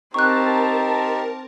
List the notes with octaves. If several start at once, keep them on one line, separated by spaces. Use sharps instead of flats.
C4 D#4 G4 A#4 A5 C#6 F#6